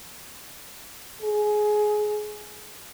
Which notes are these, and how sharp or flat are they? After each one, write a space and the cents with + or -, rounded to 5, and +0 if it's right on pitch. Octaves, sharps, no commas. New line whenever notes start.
G#4 +20